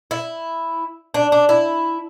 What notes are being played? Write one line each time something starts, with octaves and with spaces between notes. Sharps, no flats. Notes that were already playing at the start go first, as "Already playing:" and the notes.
E4
D4
D4
E4